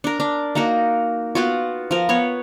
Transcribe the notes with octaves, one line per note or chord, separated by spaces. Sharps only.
D4 A#4
D4
A#3 D#4 F#4 A#4
B3 F4 F#4
F3 A#4
B3 C#5